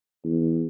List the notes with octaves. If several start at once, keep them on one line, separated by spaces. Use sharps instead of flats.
E2